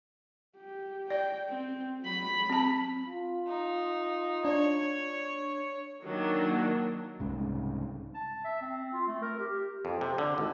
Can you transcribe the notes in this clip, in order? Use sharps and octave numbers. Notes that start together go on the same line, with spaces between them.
G4
D5 G5
C4
F#3 B5
C4 A5
F4
D#4
D4 C#5
D#3 F#3 A#3 D4
C2 G#2 C#3
A5
E5
C4
F4
A3
A#4
G4
F2
C3
D3
G#1